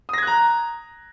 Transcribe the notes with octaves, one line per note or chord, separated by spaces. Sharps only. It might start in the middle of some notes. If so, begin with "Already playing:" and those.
A#5 D#6 F#6 G#6 A#6